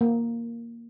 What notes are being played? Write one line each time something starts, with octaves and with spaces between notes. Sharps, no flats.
A#3